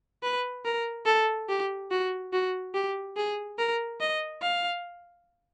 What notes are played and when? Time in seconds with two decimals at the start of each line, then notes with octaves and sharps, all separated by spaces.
0.23 B4
0.65 A#4
1.06 A4
1.49 G4
1.91 F#4
2.33 F#4
2.74 G4
3.17 G#4
3.58 A#4
4.00 D#5
4.42 F5